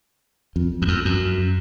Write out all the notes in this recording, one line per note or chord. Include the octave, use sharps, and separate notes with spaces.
F2
F#2
F2
F#2